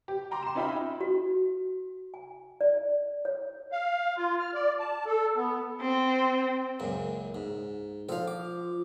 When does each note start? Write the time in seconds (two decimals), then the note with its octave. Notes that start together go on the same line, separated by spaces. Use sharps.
0.08 G4
0.31 G5 A#5 C6 D6
0.43 C6 E7
0.55 C#4 D#4 F4 E5 G5 B5
1.01 F#4
2.14 G#5
2.61 D5
3.25 C#5
3.72 F5
4.17 F4
4.39 F6
4.54 D5
4.80 A5
5.06 A4
5.37 B3
5.81 C4
6.80 C#2 F#2 A#2
7.35 G#2
8.09 F3 A4 F5
8.28 D6